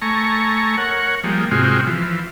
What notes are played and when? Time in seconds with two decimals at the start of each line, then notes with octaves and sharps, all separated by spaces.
0.02 A3 G#5 A#5 C#6
0.77 A#4 C#5 F#5
1.24 F3 G3 G#3 A#3
1.51 G#2 C3 G#3 C4 F4 F#4
1.87 E3 F3